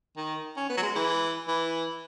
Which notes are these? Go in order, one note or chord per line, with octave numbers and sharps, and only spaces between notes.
D#3
C#4
B3
F#3
G#3
E3
E3